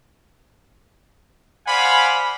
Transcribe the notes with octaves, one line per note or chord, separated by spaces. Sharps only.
C5 D5 F5 F#5 G#5 B5